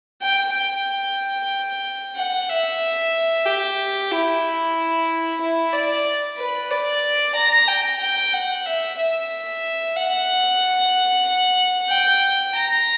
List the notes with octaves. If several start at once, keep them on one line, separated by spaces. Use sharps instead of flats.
G5
G5
F#5
E5
G4
E4
E4
D5
B4
D5
A#5
G5
G5
F#5
E5
E5
F#5
G5
A#5